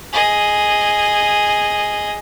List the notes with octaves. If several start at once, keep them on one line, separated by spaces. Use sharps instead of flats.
G#4 D#5